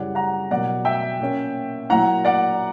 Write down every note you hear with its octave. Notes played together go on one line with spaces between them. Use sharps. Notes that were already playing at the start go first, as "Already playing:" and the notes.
Already playing: F#2 C#3 G3 C#4 E4 D5 F#5
F#5 A#5
B2 F#3 A#3 D5 F#5
E5 G5
A#2 A#3 C#4
A#2 F#3 A#3 E4 F#5 A#5
D5 F#5